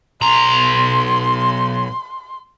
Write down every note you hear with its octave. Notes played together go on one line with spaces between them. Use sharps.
B1 A#5 C6